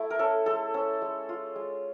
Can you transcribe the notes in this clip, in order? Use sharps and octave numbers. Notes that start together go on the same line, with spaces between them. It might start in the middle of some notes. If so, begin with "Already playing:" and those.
Already playing: A3 E4
A#4
C#4 A4
G#3 A4
C#4
G#3
F4
G#3